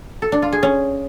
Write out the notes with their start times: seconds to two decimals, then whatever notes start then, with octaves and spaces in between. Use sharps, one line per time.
0.22 A4
0.32 D4
0.42 F4
0.53 G#4
0.63 C#4